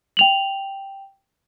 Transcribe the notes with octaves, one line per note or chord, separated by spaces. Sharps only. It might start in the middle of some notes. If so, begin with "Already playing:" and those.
G5 F7 F#7